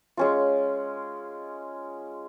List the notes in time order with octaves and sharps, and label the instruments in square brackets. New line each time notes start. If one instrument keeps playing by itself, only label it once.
[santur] G#3 C#4 F4